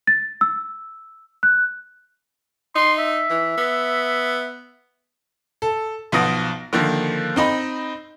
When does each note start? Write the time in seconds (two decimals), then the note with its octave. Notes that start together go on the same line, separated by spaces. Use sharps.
0.07 A6
0.41 E6
1.43 F#6
2.76 D#4 C6
2.99 E5
3.30 E3
3.57 B3
5.62 A4
6.12 B1 F3 B3 D#6 A#6 D7
6.73 D3 D#3 F3 A#3
7.36 C4 D#4 D#5 B5